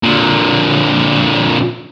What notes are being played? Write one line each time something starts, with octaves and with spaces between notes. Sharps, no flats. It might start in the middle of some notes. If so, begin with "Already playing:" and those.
A#2 D3